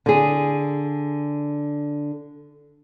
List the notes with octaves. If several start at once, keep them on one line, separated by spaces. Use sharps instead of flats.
D3 G#4